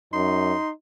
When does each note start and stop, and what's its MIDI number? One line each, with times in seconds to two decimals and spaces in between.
0.13 0.55 42
0.13 0.71 63
0.13 0.69 84